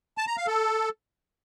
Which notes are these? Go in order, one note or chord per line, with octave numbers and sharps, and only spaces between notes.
A5
A#5
F5
A4